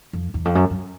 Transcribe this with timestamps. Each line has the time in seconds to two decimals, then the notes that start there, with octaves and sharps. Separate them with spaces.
0.13 F2
0.34 E2
0.45 F2
0.55 F#2
0.70 F#2